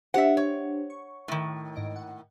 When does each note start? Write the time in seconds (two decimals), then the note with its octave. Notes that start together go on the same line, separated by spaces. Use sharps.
0.14 D4 G4 C5 E5 F#5
0.37 C#5
0.90 C#6
1.28 A2 D#3
1.76 G#2 D#5 D7
1.96 F#5